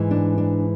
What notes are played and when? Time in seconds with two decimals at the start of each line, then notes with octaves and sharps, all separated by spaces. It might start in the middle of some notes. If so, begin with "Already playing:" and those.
Already playing: G#2 E3
0.11 D4
0.38 D4